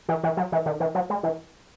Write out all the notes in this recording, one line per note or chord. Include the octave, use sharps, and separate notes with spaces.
E3
E3
F#3
E3
D#3
E3
F#3
G#3
E3